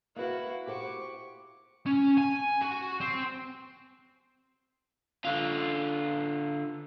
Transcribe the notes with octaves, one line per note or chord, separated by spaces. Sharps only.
A#3 E4 F#4 B4 F5
G4 C5 F#5 C#6 D6
C#4
G#5
F#4
C4
D3 F4